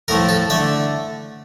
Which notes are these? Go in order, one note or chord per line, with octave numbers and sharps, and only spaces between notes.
A2 F3 A3 A#4
A4
D3 A3 E5